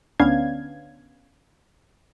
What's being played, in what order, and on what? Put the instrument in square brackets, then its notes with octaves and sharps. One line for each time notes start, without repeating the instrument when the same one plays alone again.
[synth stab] D2 B3 C#4 D4 F5 G#6